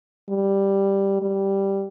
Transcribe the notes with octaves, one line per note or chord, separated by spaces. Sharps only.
G3
G3